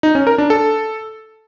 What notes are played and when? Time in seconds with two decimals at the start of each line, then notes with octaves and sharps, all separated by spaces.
0.03 D#4
0.15 C#4
0.27 A#4
0.38 D4
0.50 A4